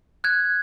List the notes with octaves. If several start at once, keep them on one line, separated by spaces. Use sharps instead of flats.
F#6 G#6